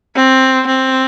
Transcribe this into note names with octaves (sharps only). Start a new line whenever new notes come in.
C4
C4